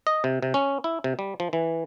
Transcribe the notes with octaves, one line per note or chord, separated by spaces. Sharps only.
D#5
C3
C3
C#4
E4
C3
G3
F3
E3